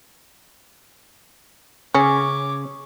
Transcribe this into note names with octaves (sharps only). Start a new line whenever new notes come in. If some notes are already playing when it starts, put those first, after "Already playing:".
C#3 C#4 C#5 D6